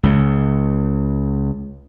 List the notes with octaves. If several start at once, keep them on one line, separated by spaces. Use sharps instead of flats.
C#2 C#3